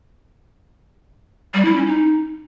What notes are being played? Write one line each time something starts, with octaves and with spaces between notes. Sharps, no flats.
G3
E4
C#4
D#4